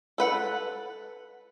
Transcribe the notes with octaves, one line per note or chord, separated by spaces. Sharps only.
A4 B4 F#5